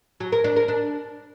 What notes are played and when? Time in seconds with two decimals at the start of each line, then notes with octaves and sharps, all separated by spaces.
0.20 F#3
0.32 A#4
0.44 D4
0.56 A#4
0.68 D4